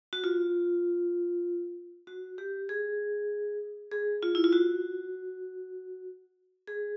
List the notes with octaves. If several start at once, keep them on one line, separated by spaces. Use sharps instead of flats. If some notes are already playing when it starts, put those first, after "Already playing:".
F#4
F4
F#4
G4
G#4
G#4
F4
E4
F4
F#4
G#4